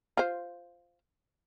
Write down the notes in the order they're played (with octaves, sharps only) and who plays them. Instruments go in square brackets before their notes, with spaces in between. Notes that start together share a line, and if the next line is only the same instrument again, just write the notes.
[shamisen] F4 C5